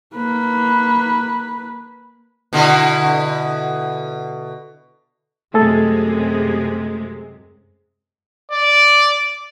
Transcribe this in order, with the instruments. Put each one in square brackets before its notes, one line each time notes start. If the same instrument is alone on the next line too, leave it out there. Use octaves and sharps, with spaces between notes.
[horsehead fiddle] A#3 B4
[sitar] B2 D3 E4
[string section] F#2 C3 G#3 [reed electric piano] A3 G#4 A4
[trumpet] D5